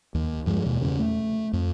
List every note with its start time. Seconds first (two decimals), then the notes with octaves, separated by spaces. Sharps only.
0.15 D#2
0.46 G2 F3 F#3 G#3
0.66 D#2 B2
0.82 E2 C#3
0.99 A3
1.53 F2